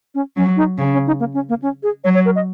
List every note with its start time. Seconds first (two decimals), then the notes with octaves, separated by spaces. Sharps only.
0.15 C#4
0.36 F#3 C#4
0.57 D#4
0.78 C#3 C#4
0.93 C#4
1.07 D#4
1.20 A#3
1.34 C#4
1.49 A#3
1.62 C#4
1.83 G#4
2.04 F#3 C#5
2.15 C#5
2.25 A#4
2.36 D#5